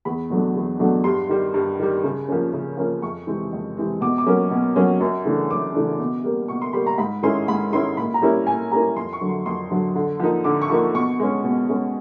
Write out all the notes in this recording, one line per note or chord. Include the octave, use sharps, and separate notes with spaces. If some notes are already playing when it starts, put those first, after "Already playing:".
E2 B5
B2 F#3 A3 D4
E2
B2 F#3 A3 D4
G2 C6
D#3 G3
G2
D#3 G3
C#3
F3 A#3 C#4
C#3
F3 A#3 C#4
F2 C#6
C3 E3 G#3 C4
F2
C3 E3 G#3 C4
B2 D6
D6
F#3 A#3 C#4
B2
F#3 A#3 C#4
F#2
C#3 E3 A3 D4
F#2 D6
C#3 E3 A3 D4
B2
G3 A#3
B2 C#6
C6
G3 A#3 B5
A#5
G#2 B5
D#3 G#3 C#4 E4 C6
G#2 B5
D#3 G#3 C#4 E4 C6
A#2 B5
A#5
G3 A#3 C#4 E4
A#2 G#5
G3 A#3 C#4 E4 A#5
F2 C6
C#6
D3 F#3
C6
F2 C6
D3 F#3
D3
F3 A#3 D#4
D3 D6
C#6
F3 A#3 D#4
C#6
B2 C#6
G#3 C#4
B2
G#3 C#4